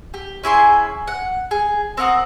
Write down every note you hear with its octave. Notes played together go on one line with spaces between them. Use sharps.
G4
C#4 E4 G#4 C6
F#5
G#4
C4 A#4 F#5 D#6